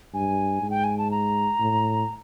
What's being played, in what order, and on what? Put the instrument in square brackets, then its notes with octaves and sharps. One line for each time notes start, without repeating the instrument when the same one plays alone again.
[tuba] G2 [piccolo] G#5
[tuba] G#2
[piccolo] G5
G#5
A5
A#5
[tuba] A2